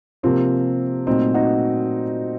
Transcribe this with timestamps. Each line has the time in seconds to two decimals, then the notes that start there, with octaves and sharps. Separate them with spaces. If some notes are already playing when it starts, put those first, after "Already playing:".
0.23 C3 F3 A#3 C4
1.07 A#2 F#3 A3 C4 D#4
1.34 D#4 F#4